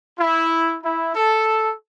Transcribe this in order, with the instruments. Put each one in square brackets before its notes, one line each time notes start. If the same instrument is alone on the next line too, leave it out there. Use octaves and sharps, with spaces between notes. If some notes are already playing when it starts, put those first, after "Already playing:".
[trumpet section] E4
E4
A4